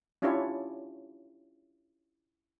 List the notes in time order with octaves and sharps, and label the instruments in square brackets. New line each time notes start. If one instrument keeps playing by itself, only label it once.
[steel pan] C#4 D4 E4 F4 G4 C#5